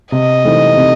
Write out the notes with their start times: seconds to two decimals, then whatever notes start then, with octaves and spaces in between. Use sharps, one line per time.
0.12 C3 D#5
0.45 E3 A3 C4 D#4
0.77 C3